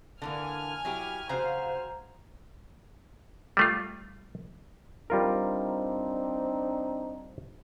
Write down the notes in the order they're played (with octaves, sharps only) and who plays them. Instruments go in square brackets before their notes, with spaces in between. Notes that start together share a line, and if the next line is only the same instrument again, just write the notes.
[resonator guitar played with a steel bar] D3 E3 A#3 [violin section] G#5 F6
[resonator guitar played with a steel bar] F#3 E4 G4
[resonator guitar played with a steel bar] C#3 [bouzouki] F#4 F5 A#5 [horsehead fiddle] C5
[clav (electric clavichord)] G3 A3 F4
[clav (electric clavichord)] G3 F4 A#4 [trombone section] C4 D4 D#4